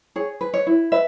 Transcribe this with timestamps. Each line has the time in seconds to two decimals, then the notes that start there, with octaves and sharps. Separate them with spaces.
0.16 G#4 C#5
0.41 B4
0.54 C#5
0.67 E4
0.92 B4 E5